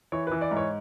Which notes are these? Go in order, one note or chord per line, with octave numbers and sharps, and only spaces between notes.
E3 C#5
E3 B4
D5
G#2
C#5